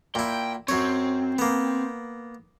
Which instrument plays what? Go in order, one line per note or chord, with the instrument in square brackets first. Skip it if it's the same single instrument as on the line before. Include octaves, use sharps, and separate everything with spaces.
[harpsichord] A#2 E4 [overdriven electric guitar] G5
[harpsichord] F#2 C#5 [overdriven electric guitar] C4
[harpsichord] A#3 B3